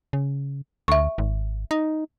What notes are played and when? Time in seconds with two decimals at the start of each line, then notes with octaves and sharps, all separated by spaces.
0.13 C#3
0.88 D2 E5 C#6
1.18 G#1
1.71 D#4